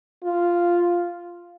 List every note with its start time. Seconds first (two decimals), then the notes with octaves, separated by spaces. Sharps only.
0.24 F4